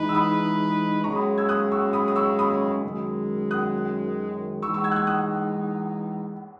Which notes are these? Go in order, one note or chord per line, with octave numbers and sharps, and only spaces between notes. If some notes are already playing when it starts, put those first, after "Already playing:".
Already playing: E3 G#3 D#4 G#4 B4
E6
B5 D#6
F#2 C#3 G#3 A#5 C#6
B5 D#6
E6 G#6
D#6 F#6
C#6 E6
B5 D#6
D#6
C#6 E6
B5 D#6
F#2 D#3 G#3
D#6 F#6
E3 G#3 D#4 C#6 E6
C#6 E6
E6 G#6
F#6
E6 G#6
D#6 F#6